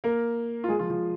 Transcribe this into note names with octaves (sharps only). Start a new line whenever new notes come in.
A#3 A#4
F4
G#3 G#4
F3 F4
F3 F4